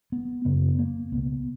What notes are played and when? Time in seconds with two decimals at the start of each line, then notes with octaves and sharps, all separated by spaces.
0.12 B3
0.45 F#2 C#3 B3
0.79 A#3
1.12 C#2 B2 B3